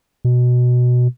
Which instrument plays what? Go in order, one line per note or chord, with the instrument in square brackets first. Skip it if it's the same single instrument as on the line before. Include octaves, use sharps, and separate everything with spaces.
[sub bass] B2